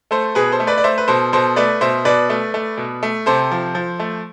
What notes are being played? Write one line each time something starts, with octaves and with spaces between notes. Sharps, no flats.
A3 A4 C5
B2 G#4 B4
A4 C5
A3
B4 D5
D5
A3 C5 E5
B4
B2 A4 C5
B2 A4 C5
A3 B4 D5
B2 C5 E5
B2 B4 D5
A3
A3
B2
A3
C3 A4 C5
F3
F3
A3